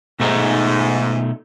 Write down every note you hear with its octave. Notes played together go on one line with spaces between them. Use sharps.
G#2 B2 A3 D#4